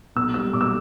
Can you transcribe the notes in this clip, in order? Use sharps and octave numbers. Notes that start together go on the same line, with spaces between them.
B1 E6
G3 E6
B1 D6
E6